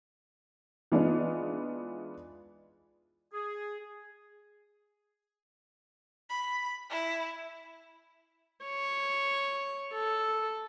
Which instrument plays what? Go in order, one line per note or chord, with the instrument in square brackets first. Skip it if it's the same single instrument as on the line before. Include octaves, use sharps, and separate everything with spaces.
[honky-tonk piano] E3 G#3 B3 D4 D#4 F4
[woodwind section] G#4
[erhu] B5
E4
[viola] C#5
A4